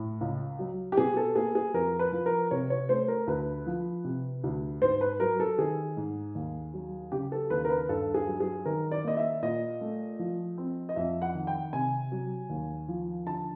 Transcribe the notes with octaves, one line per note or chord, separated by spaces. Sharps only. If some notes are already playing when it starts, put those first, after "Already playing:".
Already playing: A2
C#2
F#3
G4
B2 G#4
A4
A#3 G#4
G#4
F2 A#4
B4
F3
A#4
C3 C#5
C#5
A3 C5
A#4
D2 B4
F3
C3
D2
G#2 C5
B4
F#3 A#4
A4
D#3 G#4
G#2
D#2
F#3
C#3 G4
A4
D#2 B4
A#4
B4
G2 A4
G#4
F#3
G#4
D#3 A#4
D5
A#3 D#5
E5
A#2 D#5
A3
F3
C4
D#5
F2 E5
F#5
D#3
G5
C3 G#5
F#3
D#2
F3
D3 A5